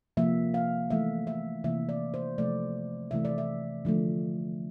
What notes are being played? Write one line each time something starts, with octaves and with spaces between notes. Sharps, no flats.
C3 F3 A#3 E5
F5
E3 A3 E5
E5
C3 E3 A#3 E5
D5
C5
C3 F3 A3 D5
C3 E3 A3 E5
D5
E5
D3 F3 A3